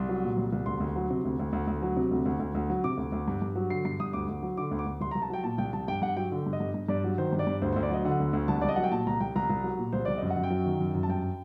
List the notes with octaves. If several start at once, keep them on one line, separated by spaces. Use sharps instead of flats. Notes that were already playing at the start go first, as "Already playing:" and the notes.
Already playing: C2 C6
F#3
A#2
C2
C2
D2 C6
D2
F#3
C3
D2
D2
D2
D2
F#3
C3
D2
D2
D2
D2
F#3
C3 D6
D2
D2
G2
G2
F#3
D3 C7
G2 C7
G2 D#6
D2 D6
D2
F#3
D3 D6
D2
D6
D2
C2 C6
A#5
C2
A5
F#3 G5
A#2 A5
C2 G5
C2 A5
G2 G5
G2 F#5
F#3 G5
D3
G2
D#5
G2
G2
G2 D5
F#3
D#3 C5
G2
D5
G2
D2 C5
C5
D2
D5
F#3 D#5
D3 F#5
D2
D2
C2 A5
C2 D5
D#5
F#3 F#5
G5
A#2 A5
C2 A#5
C2 G5
C2 A#5
C2
F#3
A#2
C2 C5
C2 D5
F#2 D#5
F#5
F#2
G5
F#3
D#3
F#2
F#2
A5
G2 G5